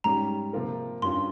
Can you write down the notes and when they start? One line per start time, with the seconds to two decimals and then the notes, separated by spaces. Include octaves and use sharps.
0.04 G#2 G3 C#4 G4 A#5
0.53 C3 F3 A#3 F4 A#4
1.02 G2 G3 C#4 F4 C6